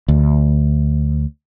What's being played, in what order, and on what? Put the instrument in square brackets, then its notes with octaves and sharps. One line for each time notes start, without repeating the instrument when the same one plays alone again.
[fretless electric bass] D2